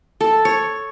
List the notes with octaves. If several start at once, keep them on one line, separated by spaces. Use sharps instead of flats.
A4
C#5